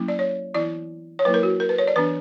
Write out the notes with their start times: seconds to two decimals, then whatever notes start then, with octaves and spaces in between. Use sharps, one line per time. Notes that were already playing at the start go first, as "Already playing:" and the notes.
Already playing: F#3 A#3 C#4 E4
0.08 D5
0.19 C#5
0.54 E3 B3 E4 D5
1.19 C#5
1.25 F#3 A#3 E4 B4
1.34 A#4
1.43 F#4
1.60 A#4
1.69 B4
1.78 C#5
1.88 D5
1.96 E3 B3 D4 B4